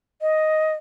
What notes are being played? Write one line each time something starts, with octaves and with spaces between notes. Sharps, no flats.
D#5